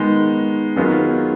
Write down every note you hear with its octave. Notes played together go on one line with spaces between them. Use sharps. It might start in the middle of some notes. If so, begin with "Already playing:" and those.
Already playing: D#3 G#3 B3 D#4
D#3 F#3 B3 F4 G#4